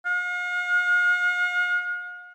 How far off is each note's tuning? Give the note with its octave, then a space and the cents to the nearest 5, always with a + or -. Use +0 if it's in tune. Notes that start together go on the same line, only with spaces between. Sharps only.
F5 +45